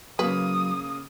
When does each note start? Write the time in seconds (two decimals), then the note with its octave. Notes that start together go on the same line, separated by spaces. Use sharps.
0.19 C#3 F#3 A#3 B4 D#6